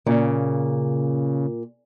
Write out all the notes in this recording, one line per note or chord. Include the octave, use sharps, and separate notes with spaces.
A#2 C#3